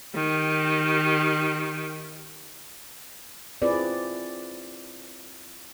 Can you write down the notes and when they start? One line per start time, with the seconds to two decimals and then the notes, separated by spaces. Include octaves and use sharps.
0.14 D#3 G4
3.62 C4 E4 F4 G#4 B4 D5